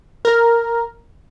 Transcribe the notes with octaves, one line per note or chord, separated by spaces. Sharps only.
A#4